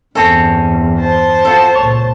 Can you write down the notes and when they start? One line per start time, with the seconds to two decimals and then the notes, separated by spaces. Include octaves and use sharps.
0.15 E2 G2 C4 C#4 A4 C#5
0.99 C5 A5
1.45 C4 F4 F#4 A4
1.75 C#2 A#2 C#5